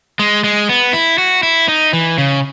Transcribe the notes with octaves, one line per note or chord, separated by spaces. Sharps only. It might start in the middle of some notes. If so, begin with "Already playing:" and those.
G#3
G#3
B3
E4
F#4
E4
D#4
E3
C#3